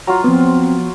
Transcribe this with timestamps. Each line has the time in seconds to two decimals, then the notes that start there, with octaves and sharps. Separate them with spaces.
0.07 F#3 F4 A#5
0.24 F3 B3 C4